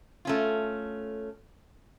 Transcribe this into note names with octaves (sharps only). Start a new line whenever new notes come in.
A3 C#4 F4